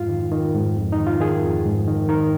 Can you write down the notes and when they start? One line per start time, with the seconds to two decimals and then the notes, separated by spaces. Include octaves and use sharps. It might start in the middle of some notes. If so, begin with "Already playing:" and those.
Already playing: F2 G#2 F4
0.09 D#3
0.32 D#3
0.54 G#2
0.77 F2
0.92 D#4
0.98 D#3
1.07 F4
1.20 D#3 G#4
1.42 F2
1.66 G#2
1.88 D#3
2.09 D#3 A#4